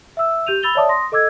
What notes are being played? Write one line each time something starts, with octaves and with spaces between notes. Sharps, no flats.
E5 E6
G4 G6 D#7 F7
B5 E6 A6 F7 G7
C#5 D5 E5 A5 D6 D#6
C6 D#6 A#6
A4 D#5 D6 E6 G#6